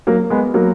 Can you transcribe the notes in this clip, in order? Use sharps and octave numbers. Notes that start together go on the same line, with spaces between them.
F#3 A#3
G#3 B3
F#3 A#3